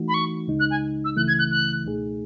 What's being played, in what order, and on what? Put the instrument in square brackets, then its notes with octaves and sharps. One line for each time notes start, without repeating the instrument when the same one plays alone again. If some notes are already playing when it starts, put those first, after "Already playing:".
Already playing: [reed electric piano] E3 A3 D#4 F#4
[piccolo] B5
C#6
[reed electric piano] C#2 C#3 G#3 D#4
[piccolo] F#6
G#5
E6
[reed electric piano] C#2 C#3 E3 A3 E4 [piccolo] F#6
[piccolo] G#6
F#6
F#6
[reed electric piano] C#2 B2 A3 D#4 G#4